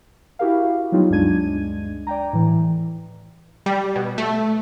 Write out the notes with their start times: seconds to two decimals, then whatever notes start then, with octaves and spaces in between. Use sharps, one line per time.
0.39 E4 F#4 G4 A#4 F5
0.92 F#3 G3 B3 D#4 F4 G4
1.10 D2 G2 G#3 D4 G#6 D#7
2.07 D5 G5 A#5
2.33 A2 E3
3.66 G3
3.96 B2
4.18 A3